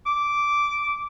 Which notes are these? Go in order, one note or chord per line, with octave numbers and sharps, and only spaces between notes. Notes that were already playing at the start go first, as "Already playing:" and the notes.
D6